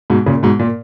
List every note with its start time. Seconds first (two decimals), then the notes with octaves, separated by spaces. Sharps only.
0.10 G#2 B2
0.26 A#2 C#3
0.43 G#2 B2
0.59 A#2